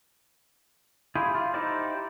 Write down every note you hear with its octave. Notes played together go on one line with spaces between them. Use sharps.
E4 F4 G4 G#4
F4
D#4 E4 G4 C5 D5